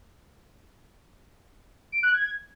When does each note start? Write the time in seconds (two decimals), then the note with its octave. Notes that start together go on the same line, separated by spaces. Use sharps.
1.92 D7
2.03 F#6
2.14 G#6